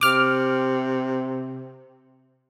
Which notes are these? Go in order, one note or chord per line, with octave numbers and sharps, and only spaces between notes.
C3 D6 F6